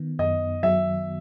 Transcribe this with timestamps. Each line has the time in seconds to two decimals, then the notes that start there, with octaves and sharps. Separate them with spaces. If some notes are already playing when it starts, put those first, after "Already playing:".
Already playing: D#3 B3
0.19 F#2 D#5
0.63 F#3 E5